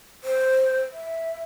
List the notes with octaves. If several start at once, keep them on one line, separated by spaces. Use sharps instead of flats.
C5
E5